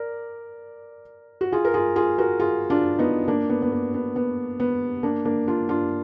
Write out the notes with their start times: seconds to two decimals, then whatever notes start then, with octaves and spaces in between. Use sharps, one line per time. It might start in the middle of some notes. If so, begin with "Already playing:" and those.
Already playing: A#4 D5
1.41 F#4
1.52 F4 G#4
1.65 A#4
1.74 F4 G#4
1.96 F4 G#4
2.18 F#4 A#4
2.40 F4 G#4
2.70 D4 F4
2.99 B3 D#4
3.28 A#3 D4
3.49 B3
3.62 B3
3.72 A#3
3.94 B3
4.16 B3
4.60 B3
5.03 A#3 D4
5.25 A#3 D4
5.47 D4 F4
5.69 D4 F4